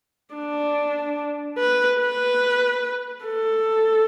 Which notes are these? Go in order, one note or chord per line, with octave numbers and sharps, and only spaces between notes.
D4
B4
B4
A4